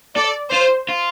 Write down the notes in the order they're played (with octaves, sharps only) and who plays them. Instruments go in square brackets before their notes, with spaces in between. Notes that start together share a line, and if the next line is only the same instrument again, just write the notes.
[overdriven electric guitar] A4 [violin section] D5
[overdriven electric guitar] F4 [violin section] C5
[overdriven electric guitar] F4